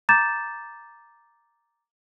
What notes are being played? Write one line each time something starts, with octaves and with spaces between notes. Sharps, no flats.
A#5 D6 G6 A6 E7